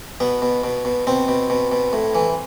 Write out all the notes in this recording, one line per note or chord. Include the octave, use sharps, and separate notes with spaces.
B2 B3
B2
B2
B2
B2 C4
B2
B2
B2
A2
E3